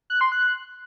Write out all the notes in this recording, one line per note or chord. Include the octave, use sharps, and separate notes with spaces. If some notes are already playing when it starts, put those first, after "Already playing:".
F#6
C6
F#6